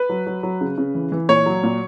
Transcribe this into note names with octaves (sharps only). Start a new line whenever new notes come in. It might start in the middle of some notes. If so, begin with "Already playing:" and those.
Already playing: B4
F#3
F#3
F#3
C#3
C#3
E3
E3
A#2 C#5
F#3
A#2